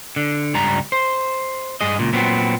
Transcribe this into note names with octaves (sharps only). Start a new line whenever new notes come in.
D3
C#2 G2 G3 A#5
C5
G2 G#4 D#5
C#2 A#2
A#2 F#3 B3 C4